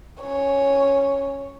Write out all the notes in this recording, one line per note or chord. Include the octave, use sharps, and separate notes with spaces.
C#4 C#5